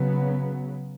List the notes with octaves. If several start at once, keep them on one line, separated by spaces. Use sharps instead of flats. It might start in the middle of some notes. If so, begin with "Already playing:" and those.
Already playing: C#3 F#3 B3